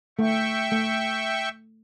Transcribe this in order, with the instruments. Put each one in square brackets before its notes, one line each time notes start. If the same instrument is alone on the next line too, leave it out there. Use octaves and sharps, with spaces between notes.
[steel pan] A3 [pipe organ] E5 G5 C#6
[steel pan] A3